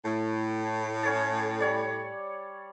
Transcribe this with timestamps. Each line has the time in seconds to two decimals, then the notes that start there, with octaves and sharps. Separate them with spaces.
0.05 A2
1.03 C#4 C#5 A5
1.60 G3 C#5 D5